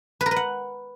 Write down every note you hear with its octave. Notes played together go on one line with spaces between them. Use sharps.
B4
A#4
B4
F#5